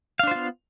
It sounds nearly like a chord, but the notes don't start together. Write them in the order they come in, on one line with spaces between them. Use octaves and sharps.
F5 D4 C5 F4 B3